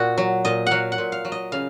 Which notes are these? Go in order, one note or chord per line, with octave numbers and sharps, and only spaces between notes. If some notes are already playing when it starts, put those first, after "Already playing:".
Already playing: A#2 F#4
F#3
A#2 D#5
F#3 F5 F#5
F#5
A#2
F5
F#3
D#5
C#3 F5